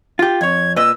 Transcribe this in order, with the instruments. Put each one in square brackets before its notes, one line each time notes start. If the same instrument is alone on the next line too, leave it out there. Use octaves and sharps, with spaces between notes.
[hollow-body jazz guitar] F4 G4
[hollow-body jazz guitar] F2 C#5 [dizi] G#6
[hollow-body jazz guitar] A#2 B4 D#5 [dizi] E6